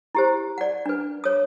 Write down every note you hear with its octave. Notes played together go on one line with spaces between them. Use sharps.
E4 G4 C5
D5 F#5
D4 B4
C#5 D#6